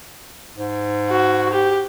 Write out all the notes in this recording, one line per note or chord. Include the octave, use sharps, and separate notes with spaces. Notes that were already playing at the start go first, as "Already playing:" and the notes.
G#2
F#4
G4